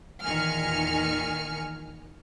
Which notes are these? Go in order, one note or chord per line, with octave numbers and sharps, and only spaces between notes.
E2 A#2 D#3 G#5 F6 C#7